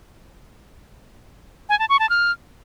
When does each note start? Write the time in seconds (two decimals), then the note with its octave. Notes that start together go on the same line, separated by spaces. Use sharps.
1.69 G#5
1.79 A5
1.89 C#6
1.99 A5
2.10 F6